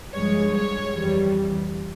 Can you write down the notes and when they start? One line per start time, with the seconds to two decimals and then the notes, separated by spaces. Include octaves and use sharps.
0.13 G2 F3 G#3 C#5
0.53 C#5
0.90 F2 E3 G3